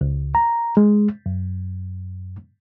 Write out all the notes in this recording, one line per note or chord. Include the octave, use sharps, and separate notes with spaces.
C#2
A#5
G#3
F#2